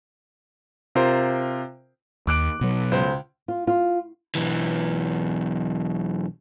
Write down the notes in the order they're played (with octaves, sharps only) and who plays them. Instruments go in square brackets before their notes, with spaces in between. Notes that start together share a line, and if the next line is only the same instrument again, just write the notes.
[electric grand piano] C3 F4 A#4 C5
[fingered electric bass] D#2 [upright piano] D6 F#6 D7
[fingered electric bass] B2 F#3
[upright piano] C#2 C5
[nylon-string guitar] F4
F4
[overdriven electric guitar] B1 E3